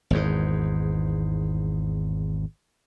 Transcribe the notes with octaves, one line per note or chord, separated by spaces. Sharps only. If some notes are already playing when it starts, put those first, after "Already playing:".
G#1 E2 G#2